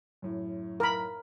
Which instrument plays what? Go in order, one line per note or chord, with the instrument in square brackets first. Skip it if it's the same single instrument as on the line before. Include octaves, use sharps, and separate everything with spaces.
[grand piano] F#2 A2
[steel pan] A#4 B5